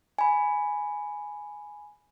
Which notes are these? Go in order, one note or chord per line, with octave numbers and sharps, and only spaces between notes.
G#5 B5